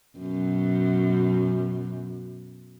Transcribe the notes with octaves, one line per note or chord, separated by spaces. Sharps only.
F#2 B2